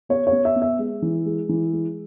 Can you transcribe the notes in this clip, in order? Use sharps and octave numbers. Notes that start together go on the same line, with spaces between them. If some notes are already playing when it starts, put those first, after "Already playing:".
B3 C#5
C#5
B3
E5
B3
E5
G#3
E3
G#3
E3
G#3